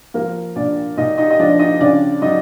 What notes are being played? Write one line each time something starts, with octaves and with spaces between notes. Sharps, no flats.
F3 A#3 A#4
A#2 D4 D5
A#2 D#4 D#5
D#4 D#5
D#5
F3 D4 D5
D#4 D#5
C#3 D4 D5
F#3 D#4 D#5